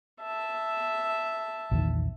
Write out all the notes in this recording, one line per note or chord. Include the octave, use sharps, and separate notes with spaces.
E5 A5
A#1 E2 D#3